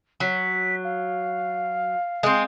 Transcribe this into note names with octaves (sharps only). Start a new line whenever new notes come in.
F#3 B6
F5
G#3 C4